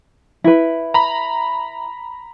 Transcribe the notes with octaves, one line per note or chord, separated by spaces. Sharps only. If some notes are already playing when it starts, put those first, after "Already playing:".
E4 B4
A#5 B5